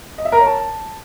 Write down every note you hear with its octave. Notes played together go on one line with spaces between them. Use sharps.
D#5
E5
A#4
C#5
A5